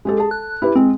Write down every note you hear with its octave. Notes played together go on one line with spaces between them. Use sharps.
G#3 G4 A4
G#4 A4 A5
F#6
E4 G4 B4
G#3 C4